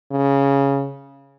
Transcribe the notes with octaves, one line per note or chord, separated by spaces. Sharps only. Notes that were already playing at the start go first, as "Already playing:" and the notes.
C#3